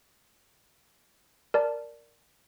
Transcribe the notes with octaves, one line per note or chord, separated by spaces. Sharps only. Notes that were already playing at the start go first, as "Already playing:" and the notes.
A#4 D5 A5